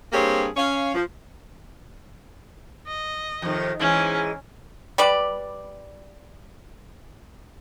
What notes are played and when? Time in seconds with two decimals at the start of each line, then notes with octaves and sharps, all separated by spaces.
0.12 G2 A#3 C4 G4 G#4 C#5
0.56 C#4 C#5 F5
0.94 F3
2.88 D#5
3.42 F2 C3 D#3
3.79 G#2 E3 G#3 C#4
4.98 G3 B4 D5